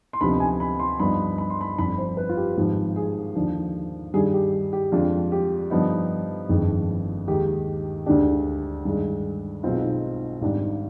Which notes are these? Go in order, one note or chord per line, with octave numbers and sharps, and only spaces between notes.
C6
D2 C3 F3 B3 D#4 B5
G#5
B5
C6
G2 F3 B3 D#4 B5
B5
C6
B5
G1 F2 D3 B5
C5
B4
F4
G4
G#1 G#2 F3 G4
G#4
D#2 D3 F3
G2 D#3 G3 D4 G#4
G4
G4
F2 D3 G#3 D4 F4
G4
G2 D3 F3 B3 D#4
G1 F2 D#3 G#3
D#2 D#3 G#3 G4
D2 D3 G#3 D4 G4
G2 D#3 G#3
B1 B2 G#3 C4 D#4 F4
G#1 G#2 G3 D4 G4